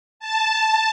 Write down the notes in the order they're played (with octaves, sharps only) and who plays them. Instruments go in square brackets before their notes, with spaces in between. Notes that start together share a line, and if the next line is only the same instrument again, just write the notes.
[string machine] A5